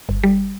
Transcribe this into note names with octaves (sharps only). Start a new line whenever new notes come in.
G1
G3